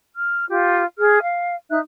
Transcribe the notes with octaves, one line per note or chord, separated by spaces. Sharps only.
F6
F4 G4
G#4 F6
F5
D#4 E5 F#6